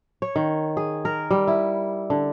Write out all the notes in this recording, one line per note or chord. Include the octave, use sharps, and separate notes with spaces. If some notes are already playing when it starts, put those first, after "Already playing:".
C#5
D#3
G#4
A#4
G3
E4
D3